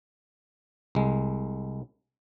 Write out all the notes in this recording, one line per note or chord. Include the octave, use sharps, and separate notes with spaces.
C2 G#3